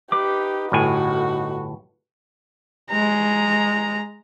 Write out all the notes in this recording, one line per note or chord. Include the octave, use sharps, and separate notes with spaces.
D#4 G4 B4 D6
G1 A2 F#4 G#5
G#3 A#5